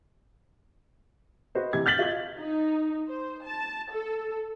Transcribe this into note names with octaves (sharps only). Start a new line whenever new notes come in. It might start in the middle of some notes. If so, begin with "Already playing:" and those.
F#4 B4 C5 D#5
C3 E3 G4 G#6
F6 G6 A6 B6 F#7 G7
F4 F#4 D#5 G#6
D#4
C5
A5
A4